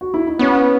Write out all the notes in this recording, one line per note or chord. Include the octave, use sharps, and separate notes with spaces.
F#4
E4
D#4
B3 C#4